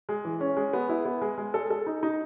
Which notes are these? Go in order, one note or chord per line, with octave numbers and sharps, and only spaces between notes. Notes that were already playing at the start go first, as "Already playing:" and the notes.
G#3
E3
C#4
G#3
B3
E4
B3
G#3
G#3
A4
A4
D#4
D#4